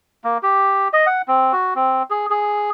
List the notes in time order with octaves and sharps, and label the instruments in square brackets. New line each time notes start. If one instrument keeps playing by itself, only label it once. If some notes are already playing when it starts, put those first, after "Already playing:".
[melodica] A#3
G4
D#5
F#5
C4
F#4
C4
G#4
G#4